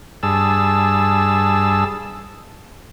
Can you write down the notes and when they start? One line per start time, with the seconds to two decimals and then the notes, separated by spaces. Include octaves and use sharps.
0.23 G2 G#4 A5 E6